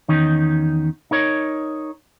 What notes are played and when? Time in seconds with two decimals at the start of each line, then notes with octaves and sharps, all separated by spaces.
0.08 E2 D#3 C#4 D#4
1.11 D#4 A#4 C#5